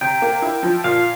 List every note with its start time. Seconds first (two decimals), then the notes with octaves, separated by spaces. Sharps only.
0.01 C3 G5
0.22 A#3
0.42 E4
0.63 F3
0.84 A#2 F5